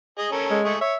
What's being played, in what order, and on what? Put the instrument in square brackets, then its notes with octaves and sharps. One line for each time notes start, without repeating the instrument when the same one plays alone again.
[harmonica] G#4 D#5
C#4 A4 A#4
[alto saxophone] G#3
[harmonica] A3 G#4 C#6
[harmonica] C#5 [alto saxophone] E5